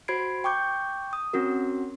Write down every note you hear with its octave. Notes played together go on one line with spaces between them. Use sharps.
F#4 C5 B5 G#6 C7 D7
G5 C#6 D6 G6
D#6
C4 C#4 F#4 A#4